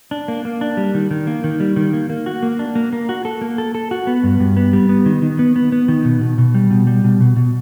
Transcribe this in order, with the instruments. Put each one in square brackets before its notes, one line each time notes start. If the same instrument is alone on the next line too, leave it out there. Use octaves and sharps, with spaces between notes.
[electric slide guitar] D4
A#3
A#3
D4
G3
D#3
D#3
A#3
D#3
G3
D#3
A#3
A#3
F#4
A#3
D4
A#3
A#3
F#4
A4
A#3
A4
A4
F#4
B3
G2
G2
B3
G3
B3
D#3
D#3
B3
B3
B3
D#3
B2
B2
B2
G3
B2
G3
B2
B2
B2